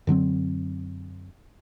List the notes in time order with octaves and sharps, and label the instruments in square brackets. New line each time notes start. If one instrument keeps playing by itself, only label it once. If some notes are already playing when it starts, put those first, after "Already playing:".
[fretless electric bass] F#2 D3 F#3 C4